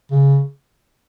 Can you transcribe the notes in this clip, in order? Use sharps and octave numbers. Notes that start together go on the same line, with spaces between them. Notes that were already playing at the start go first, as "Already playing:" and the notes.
C#3